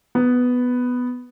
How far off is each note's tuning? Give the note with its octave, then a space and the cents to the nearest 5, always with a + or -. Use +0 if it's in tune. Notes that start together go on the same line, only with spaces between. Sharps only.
B3 +5